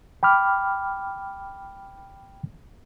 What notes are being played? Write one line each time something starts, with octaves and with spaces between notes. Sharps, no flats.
G5 B5 D6 F6